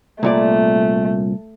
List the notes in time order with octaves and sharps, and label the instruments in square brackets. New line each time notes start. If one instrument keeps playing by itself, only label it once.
[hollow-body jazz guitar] C2 A#2 D5 [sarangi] A3